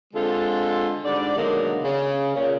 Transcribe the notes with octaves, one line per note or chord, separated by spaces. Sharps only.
D3 G#3 C4 F4 A4
G#2 D3 G3 D5
B2 D3 D#3 F#3 G#3 A#3
C#3
A#2 C#3